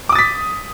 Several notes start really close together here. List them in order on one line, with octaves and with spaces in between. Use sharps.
D6 D#6 A6 B6